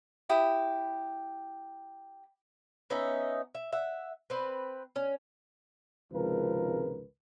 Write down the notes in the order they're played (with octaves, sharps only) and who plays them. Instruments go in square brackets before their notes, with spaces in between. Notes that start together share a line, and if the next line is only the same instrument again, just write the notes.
[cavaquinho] E4 G4 D#6
[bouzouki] B3 C#4 D#4 E5
E5
E5 F#5
C4 B4
C#4
[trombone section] G#1 C#2 C3 F3 A#4 B4